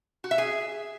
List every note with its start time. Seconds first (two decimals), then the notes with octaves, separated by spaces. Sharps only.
0.24 F#4
0.31 E5
0.38 G#4